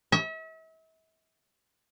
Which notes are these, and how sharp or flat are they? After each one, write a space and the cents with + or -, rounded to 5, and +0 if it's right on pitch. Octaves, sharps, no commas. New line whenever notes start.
E5 -40